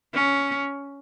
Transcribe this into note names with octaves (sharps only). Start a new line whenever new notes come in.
C#4